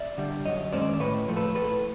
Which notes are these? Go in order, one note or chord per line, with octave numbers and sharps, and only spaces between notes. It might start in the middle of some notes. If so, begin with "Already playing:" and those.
Already playing: D5 E5
D3 G3
F#2 C#5 D#5
D#3 G#3 C#4 C5 D5
A2 B4 C#5
F3 A3
A4 B4
A2 A4 B4